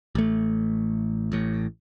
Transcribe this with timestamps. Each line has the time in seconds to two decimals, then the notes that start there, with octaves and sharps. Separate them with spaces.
0.15 A1 A3
1.32 A1 A2